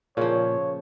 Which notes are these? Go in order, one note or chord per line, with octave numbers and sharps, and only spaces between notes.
A#2 C#3 F3 C#5